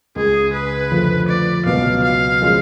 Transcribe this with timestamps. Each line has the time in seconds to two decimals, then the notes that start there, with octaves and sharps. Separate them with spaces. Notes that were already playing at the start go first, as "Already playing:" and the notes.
0.16 C#2 C#3 G#3 G#4
0.53 B4
0.91 F2 D3 F3 A3
1.28 D5
1.65 C#2 B2 F#3 B3 F5
2.03 F5
2.42 F3 G#3 C#4